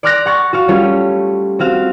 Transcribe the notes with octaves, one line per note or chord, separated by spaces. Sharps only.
D5 C6 D6 F6 F#6 A#6
F#5 C#6 A6
F#4 F5 C#6
G3 A3 C#4 F4 C#5
C4 F#4 F5